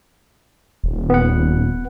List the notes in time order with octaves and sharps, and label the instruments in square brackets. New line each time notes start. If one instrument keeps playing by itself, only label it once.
[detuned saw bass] D#1
[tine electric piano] B3 F#5